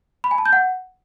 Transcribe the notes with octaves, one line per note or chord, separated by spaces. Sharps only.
B5
G#5
A5
G6
F#5